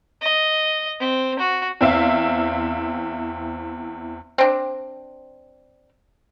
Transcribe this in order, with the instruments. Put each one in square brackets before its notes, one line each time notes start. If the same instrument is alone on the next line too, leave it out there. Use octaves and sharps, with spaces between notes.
[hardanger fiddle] D#5
C4
F#4
[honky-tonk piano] E2 C4 E5 F5
[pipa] C4 D4